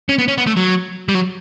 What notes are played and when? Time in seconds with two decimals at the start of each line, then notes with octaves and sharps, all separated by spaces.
0.09 C#4
0.19 B3
0.28 C#4
0.38 B3
0.47 A3
0.57 F#3
1.09 G3
1.14 F#3